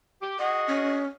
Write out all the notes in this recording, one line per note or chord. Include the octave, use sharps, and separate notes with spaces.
G4
F#4 G#4 D#5 F#5
C#4